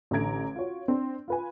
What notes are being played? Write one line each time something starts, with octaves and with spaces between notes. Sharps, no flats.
A1 D3 A3 A#5 G#6 D7
F4 F#4 C#5
C4 D4
F4 B4 G#5